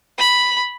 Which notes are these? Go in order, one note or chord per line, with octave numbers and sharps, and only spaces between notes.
B5